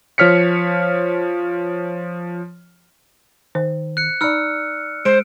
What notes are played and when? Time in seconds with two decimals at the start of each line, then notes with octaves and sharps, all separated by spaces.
0.18 F3 C#5 F6 B6 C#7
3.55 D#3 C5
3.97 F#6 C#7
4.21 D#4 D5 A#5 E6 F6 C#7
5.05 G#3 C5 D7